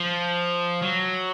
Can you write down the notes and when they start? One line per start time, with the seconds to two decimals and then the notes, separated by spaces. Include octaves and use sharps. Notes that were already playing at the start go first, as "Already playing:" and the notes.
Already playing: F3
0.82 F#3